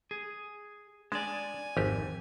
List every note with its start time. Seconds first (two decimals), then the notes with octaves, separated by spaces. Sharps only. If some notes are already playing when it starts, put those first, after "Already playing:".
0.11 G#4
1.12 G#3 D4 D5 G#5
1.77 G#1 F2 G4